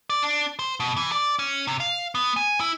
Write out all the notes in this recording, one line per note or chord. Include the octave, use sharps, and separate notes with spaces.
D5
D4
C5
B2
E3
D5
C#4
C3
F5
B3
G#5
E4